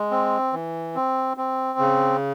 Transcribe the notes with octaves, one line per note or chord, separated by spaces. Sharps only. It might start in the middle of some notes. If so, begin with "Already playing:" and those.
Already playing: G#3
C4
E3
C4
C4
C#3